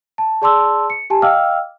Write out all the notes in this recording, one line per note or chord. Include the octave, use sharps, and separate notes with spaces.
A5
G#4 D5 A5 C6 D6 E6
C#7
G4 G#5 A5
D#5 F5 G5 D6 E6 F6